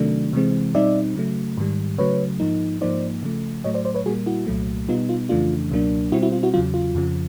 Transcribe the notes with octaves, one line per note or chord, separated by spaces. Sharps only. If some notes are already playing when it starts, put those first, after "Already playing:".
Already playing: C3 D#3 F#3 A3 D4
C3 E3 G#3 C4
B2 G3 C4 D#4 D5 E5
C#3 F#3 A3
G#2 D#3 G3
C#3 F#3 A3 B4 C#5
G#2 F3 A#3 D#4
G#2 F3 A#3 D#4 C5 D5
C#3 F3 A3
A2 F#3 A3 C#5 D#5
C5 D5
C5 D5
B4 C#5
A#2 G3 A#3 F#4 G#4
E4 F#4
C2 A#2 F#3 A3
B2 G3 B3 D#4 F4
F4
F2 C#3 E3 A3 D4 F4
C#2 B2 F#3 A#3 D4
B2 G3 C4 E4 F#4
E4 F#4
F4
E4 F#4
E2 C#3 F#3 F4
F4
F2 C#3 F3